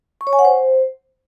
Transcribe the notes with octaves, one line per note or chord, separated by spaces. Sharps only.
C#6
C#5
G#5
F#5
C5